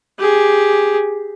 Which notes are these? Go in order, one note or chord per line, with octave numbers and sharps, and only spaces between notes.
G4 G#4